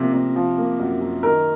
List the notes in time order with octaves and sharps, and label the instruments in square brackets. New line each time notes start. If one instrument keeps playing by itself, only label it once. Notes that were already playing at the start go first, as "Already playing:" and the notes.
Already playing: [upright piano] C3 F3 A#3
C3
F3
A#3
F#2
F#2
D#3 A#4